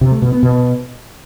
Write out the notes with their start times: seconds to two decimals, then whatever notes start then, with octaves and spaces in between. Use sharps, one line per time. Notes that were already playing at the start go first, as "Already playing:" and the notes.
0.01 C3
0.12 A3
0.22 B2
0.32 B3
0.43 B2